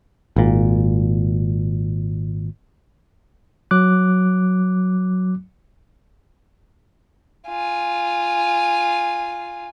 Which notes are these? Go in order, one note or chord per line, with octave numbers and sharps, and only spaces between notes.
G#1 A#2
F#3 D6 F#6
F4 G#5